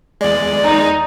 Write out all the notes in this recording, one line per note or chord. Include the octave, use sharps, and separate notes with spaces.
E2 G#3 D5
D#4